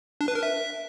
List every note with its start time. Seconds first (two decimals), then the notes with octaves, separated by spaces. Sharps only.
0.21 D4
0.28 B4
0.35 A#4
0.43 E5